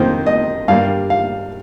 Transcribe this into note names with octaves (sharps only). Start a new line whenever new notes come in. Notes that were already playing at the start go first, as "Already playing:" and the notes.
Already playing: F2 D#3 A#3 C5
D#5
G2 G3 A#3 F5
F5